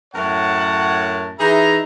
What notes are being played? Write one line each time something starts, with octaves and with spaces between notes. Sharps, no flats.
F#2 A2 A#4 C#5 F#5 A5
E3 D#4 G#4 E5 A#5